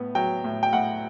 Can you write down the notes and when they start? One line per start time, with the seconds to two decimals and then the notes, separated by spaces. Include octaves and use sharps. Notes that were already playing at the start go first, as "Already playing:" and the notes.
Already playing: A2 B3
0.15 F#3 G5
0.44 A2
0.63 G5
0.73 A2 F#5